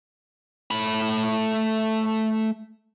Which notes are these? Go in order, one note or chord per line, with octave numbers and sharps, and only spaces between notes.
A3 B5